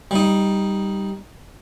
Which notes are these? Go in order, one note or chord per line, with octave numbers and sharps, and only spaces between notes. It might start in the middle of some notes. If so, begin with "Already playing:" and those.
G3 D#4